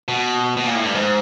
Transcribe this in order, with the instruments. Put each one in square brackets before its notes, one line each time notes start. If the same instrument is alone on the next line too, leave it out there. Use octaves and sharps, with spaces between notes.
[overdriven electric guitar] B2
B2
A#2
A2
G2
G#2